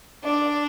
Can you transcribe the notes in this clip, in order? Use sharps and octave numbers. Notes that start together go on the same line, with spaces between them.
D4 D5